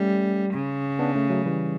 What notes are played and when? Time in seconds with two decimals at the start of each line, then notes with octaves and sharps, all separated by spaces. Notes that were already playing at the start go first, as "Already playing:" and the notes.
Already playing: G3 A3 C#4
0.54 C#3
0.99 B3 D4
1.15 A3 C#4
1.30 F#3 A3
1.45 E3 G3